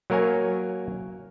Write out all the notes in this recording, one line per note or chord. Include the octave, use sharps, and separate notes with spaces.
F#3 A#3 A#4 C#5 G#5